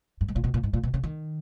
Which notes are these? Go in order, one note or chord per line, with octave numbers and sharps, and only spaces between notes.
G2
G#2
A#2
B2
A#2
G#2
A#2
B2
C#3
D#3